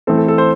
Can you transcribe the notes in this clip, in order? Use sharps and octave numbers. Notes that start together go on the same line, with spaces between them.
E3 A3 C4 A4
A4
A4
C5